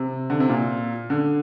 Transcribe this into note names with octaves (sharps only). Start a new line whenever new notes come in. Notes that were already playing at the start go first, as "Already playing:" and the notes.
Already playing: C3
D3
C3
A#2
D3